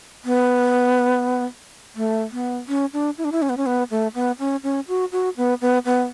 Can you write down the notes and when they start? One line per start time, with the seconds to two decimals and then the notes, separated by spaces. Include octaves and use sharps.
0.25 B3
1.96 A3
2.32 B3
2.68 C#4
2.93 D4
3.18 E4
3.24 D4
3.32 E4
3.42 C#4
3.49 B3
3.57 C#4
3.66 B3
3.90 A3
4.15 B3
4.39 C#4
4.63 C#4
4.88 F#4
5.12 F#4
5.37 B3
5.61 B3
5.85 B3